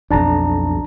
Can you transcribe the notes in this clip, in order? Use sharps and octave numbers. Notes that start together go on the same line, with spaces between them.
B1 F2 D4 A5 A#5